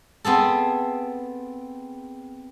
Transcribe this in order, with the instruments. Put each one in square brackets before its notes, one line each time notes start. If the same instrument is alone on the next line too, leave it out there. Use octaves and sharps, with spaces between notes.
[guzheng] B3 C4 G#4 A4